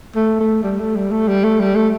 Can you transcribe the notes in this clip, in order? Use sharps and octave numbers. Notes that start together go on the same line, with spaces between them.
A3
A3
G3
A3
G3
A3
G3
A3
G3
A3